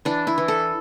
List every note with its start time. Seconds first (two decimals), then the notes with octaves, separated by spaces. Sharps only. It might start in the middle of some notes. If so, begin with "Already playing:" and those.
0.05 E3 D4
0.27 E4
0.38 E3
0.48 A4